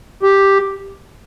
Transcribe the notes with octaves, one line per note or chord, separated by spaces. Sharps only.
G4